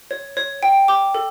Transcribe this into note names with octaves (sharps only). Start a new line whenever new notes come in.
C#5
C#5
G5
D6
A4